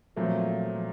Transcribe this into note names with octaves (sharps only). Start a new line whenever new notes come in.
A#2 F3 F#3 A3 C4